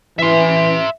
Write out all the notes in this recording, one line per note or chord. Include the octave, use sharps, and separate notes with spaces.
E3 E5 C6